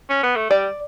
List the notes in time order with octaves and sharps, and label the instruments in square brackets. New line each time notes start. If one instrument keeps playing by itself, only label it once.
[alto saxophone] C#4
B3
A3
[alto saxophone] G3 [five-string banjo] D5